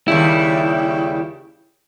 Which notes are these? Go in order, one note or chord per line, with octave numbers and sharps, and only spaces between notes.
D#2 C#3 G3 E4